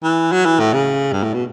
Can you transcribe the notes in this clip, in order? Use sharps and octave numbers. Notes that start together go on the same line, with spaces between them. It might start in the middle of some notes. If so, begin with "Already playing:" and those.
E3
F#3
E3
A2
C#3
G2
A2
B2